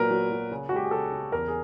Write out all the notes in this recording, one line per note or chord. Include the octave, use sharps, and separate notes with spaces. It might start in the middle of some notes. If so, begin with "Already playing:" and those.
Already playing: A#2 F#3 A#4 B4
F#3
F#3
C#3
F#4
G#3 G4
G#4
C#3 A4
C#3
E2 A#4
G#4